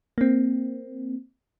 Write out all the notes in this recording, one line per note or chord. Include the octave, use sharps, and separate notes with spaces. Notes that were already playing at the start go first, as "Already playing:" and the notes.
A#3 C4